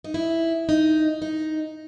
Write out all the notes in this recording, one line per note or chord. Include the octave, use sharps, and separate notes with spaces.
D#4
E4
D#4
D#4